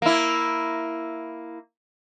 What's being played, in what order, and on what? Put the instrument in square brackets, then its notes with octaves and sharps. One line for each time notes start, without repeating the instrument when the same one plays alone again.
[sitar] A#3 E4